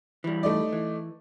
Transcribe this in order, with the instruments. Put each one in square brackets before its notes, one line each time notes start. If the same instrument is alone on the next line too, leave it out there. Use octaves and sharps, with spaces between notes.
[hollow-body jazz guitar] E3 G3
[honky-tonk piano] A3 D#4 D5
[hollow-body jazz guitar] E3